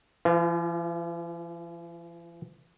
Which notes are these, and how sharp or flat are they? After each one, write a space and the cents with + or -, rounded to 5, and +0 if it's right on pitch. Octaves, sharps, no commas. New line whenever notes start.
E3 +45 F4 -5